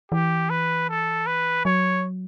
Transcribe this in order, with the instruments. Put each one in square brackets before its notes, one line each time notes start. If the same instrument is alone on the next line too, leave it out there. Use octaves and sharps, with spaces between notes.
[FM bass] E3 [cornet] G4
[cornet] B4
A4
B4
[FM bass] F#3 [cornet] C#5